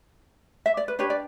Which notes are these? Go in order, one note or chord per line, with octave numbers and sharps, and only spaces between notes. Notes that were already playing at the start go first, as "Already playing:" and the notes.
E5
D5
B4
D4 G4 B4 C#5
D5